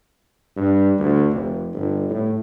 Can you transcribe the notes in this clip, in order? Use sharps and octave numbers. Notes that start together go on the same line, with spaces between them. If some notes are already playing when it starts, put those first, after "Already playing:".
G2
D2
F1
G1
A2